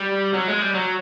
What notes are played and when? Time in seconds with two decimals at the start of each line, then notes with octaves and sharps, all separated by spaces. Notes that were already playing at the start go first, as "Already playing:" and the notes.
Already playing: G3
0.33 F#3
0.48 G#3
0.61 G3
0.74 F#3